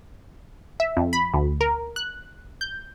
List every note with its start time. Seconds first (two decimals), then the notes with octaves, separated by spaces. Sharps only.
0.80 E5
0.97 F2
1.13 B5
1.33 D2
1.61 A#4
1.96 F#6
2.61 G6